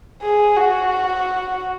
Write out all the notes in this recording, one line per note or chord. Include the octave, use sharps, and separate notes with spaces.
G#4
F#4